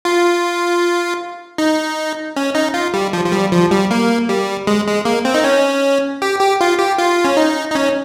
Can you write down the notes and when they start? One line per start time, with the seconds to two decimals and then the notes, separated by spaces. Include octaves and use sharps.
0.05 F4
1.58 D#4
2.36 C#4
2.55 D#4
2.74 F4
2.94 G3
3.13 F3
3.25 F3
3.32 G3
3.52 F3
3.71 G3
3.91 A#3
4.29 G3
4.67 G#3
4.87 G#3
5.05 A#3
5.25 C4
5.34 D#4
5.44 C#4
6.22 G4
6.41 G4
6.61 F4
6.79 G4
6.98 F4
7.25 C#4
7.37 D#4
7.71 D#4
7.75 C#4